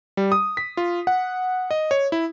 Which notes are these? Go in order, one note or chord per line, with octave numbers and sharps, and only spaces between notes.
G3
D#6
B6
F4
F#5
D#5
C#5
E4